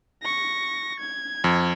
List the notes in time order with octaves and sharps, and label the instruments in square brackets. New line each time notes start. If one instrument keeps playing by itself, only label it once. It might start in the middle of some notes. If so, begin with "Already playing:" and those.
[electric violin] C#6 A#6
G#6
[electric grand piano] F2